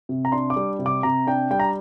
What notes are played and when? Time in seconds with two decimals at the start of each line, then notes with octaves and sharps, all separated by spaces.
0.09 C3
0.25 A#5
0.32 D4 C6
0.50 D6
0.56 G3
0.79 C3
0.86 D6
1.03 C3 A#5
1.27 D4 G5
1.51 G3 G5
1.60 A#5